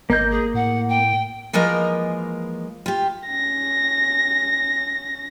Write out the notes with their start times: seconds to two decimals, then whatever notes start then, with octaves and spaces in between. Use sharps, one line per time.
0.10 G#1 A#3 D#5 G6
0.30 G#4
0.54 A2 F#5
0.88 G5
1.53 E3 F3 G#3 A#3 A#4 D#5
2.86 F4 G4
3.27 C#4 A#6